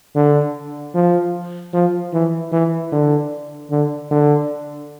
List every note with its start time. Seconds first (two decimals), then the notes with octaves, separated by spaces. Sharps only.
0.16 D3
0.95 F3
1.73 F3
2.13 E3
2.52 E3
2.92 D3
3.71 D3
4.11 D3